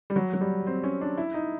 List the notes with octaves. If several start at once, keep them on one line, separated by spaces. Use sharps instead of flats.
G3
F#3
F#3
G3
C4
C#4
D4
E4
D#4